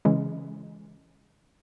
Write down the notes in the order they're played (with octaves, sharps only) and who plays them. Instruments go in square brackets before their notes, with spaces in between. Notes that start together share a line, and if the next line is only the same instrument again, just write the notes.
[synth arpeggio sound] C#3 E3 G#3 C#4